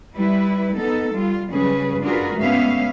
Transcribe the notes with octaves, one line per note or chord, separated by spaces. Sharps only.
G3 E4 B4
B3 D#4 A4
G3 F4
C#3 F#3 G3 C#4 G#4 B4
D4 F4 F#4 G#4 A#4 B4
D2 G#2 B3 C#4 E5 F5